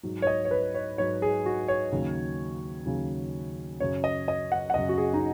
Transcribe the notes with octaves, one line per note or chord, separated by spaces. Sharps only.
G#2 F#3
C#5
D#5
C#5
B4
C#5
G#2 F#3 C#5
G#4
F#4
C#5
D#2 C#3 F#3
D#2 C#3 F#3
F#2 C#3 F#3 C#5
D#5
D#5
F#5
F#5
F#2 C#3 F#3 D#5
F#4
G#4
D#4